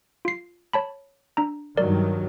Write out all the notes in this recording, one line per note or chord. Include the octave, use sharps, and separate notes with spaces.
F4 C7
C#5 A5 B5
D4 A#5
G2 D#3 F#3 A#4 D5